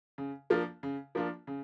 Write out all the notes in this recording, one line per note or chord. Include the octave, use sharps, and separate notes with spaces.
C#3
F3 A#3 D4 F4
C#3
F3 A#3 D4 F4
C#3